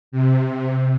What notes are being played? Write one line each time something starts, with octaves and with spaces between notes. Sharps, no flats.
C3